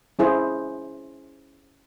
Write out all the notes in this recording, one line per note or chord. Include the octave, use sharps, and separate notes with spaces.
C#4 E4 G#4 C5